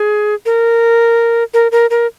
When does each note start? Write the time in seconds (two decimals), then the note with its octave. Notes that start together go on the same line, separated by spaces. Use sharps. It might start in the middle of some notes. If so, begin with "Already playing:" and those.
Already playing: G#4
0.46 A#4
1.54 A#4
1.72 A#4
1.90 A#4